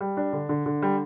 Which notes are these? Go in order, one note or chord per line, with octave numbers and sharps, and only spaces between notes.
G3
D4
D3
D3
D3
G3